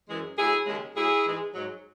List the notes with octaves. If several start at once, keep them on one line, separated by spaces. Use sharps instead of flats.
F#2 E3 G#3
A2 F#3 E4 G#4
D#2 C#3 G#3
A2 F#3 E4 G#4
G#2 E3 G#3
G#2 F#3